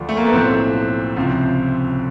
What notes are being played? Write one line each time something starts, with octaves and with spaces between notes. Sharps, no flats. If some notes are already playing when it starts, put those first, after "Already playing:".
Already playing: D2 D3 F3
A3
A#3
B3
B1 A2 F3 C4
C#2 C3 F3